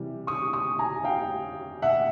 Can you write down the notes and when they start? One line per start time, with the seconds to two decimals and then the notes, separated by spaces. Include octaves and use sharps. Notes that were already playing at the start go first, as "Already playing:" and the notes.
Already playing: C3 E3 G3
0.27 C#6 D#6
0.53 C#6 D#6
0.79 G#5 A#5
1.04 F5 G5
1.82 E5 F#5